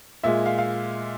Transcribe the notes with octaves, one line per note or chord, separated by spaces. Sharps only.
A#2 G#3 E5
F5
F5